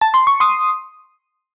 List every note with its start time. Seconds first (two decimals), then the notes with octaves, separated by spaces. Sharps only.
0.01 A5
0.14 C6
0.27 C#6
0.40 C6 D#6